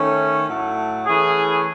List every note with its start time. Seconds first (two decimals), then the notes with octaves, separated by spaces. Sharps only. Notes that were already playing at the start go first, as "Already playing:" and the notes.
Already playing: D#3 A3 C#4
0.47 A2 F#3 A3
1.07 E3 A3 C#4 E4 G#4 B4